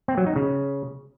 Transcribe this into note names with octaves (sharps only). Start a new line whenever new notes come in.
C4
F#3
D#4
C#3